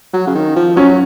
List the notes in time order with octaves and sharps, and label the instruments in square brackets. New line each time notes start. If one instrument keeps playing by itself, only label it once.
[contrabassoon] F#3
C#3
D#3
F3
[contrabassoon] F#3 [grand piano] C#4